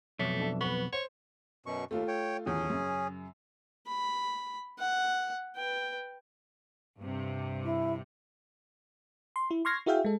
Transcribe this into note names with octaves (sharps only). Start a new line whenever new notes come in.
B1 F2 A3 C#5
D4 A4 E5
B3 B4 C#6
C5 C#5
F#2 B2 C#6
D#2 A3 F4
C#5 G5
D#1 E2 C#4 G#4
F#2 C#3
B5
F#5
B4 G5
G2 C3
E4
C6
E4
C6 C#6 F6 G#6 A#6 C7
E4 F#4 G#4 E5 F5 G5
G#3 A4